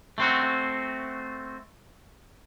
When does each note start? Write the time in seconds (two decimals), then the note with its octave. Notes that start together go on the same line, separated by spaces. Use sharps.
0.18 A3 C4 F#4